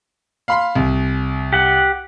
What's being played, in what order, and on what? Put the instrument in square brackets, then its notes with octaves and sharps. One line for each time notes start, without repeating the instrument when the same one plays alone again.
[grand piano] F5 B5 C6
C2
[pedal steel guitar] G4 F#5